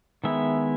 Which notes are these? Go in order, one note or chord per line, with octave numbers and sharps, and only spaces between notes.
D#3 G#3 B3 E4 E5